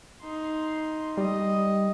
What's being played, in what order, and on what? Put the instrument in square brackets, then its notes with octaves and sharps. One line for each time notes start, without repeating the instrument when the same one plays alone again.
[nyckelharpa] D#4 C6
[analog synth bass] G3 [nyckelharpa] D#5